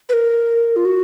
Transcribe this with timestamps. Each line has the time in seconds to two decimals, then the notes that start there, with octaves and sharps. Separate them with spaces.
0.09 B4
0.13 A#4
0.76 F4
0.85 F#4